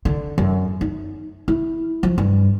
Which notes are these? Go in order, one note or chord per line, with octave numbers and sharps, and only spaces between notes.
D3
F#2
D#4
E4
F3
G2